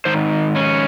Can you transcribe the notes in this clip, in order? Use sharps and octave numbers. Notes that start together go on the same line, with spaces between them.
G#2 D#3 C5
C#4